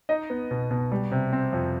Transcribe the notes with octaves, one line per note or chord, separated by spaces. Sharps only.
D#4 D#5
B3
B2
B2
G3
C3
C4
F2